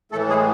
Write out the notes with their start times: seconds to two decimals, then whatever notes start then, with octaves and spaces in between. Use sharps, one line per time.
0.12 A2 A3 A4
0.15 E3
0.29 G#3 G#4